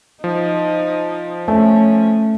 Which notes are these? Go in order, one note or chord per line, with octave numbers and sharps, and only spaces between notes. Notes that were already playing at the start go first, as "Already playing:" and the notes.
F3 D#4
A3 C#4